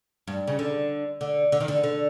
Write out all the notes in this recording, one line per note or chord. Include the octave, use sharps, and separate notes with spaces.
G2
C#3
D3
D3
D3
D#3
D3
D3